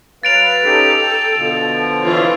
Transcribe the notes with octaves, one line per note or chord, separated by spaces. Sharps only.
F#3 B4 F5 A6 D7 F7
C#4 D#4 G4 A4
G5
B2 D3 F3
E3 F4 C#5